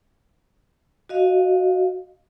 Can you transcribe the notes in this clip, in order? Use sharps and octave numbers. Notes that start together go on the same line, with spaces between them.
F#4 D#5 F5